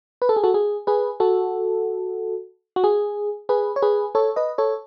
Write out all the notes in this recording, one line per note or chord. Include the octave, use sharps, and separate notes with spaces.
B4
A4
G#4
F#4 A4
G#4
G#4 B4
F#4 A4
F#4
G#4
G#4 B4
C#5
G#4 B4
A4 C#5
B4 D#5
A4 C#5